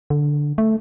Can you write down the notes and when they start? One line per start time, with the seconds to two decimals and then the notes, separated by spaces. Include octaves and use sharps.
0.10 D3
0.58 A3